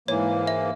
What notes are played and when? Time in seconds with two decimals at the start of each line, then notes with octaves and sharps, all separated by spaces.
0.08 G#2 E3 A#3 C#5
0.47 E5